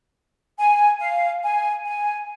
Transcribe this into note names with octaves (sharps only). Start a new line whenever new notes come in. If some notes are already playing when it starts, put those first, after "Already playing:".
G#5
F5
G#5
G#5